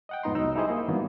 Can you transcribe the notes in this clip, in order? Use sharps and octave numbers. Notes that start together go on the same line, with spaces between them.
D#5 F#5 G5
F2 G#2 B3 D#4 A#5 C6
C2 F#3 D#4 E6
D#4 E4 G4 G#4 C5 D#5
A#3
G2 D#3 E3 F#3 A#3 B3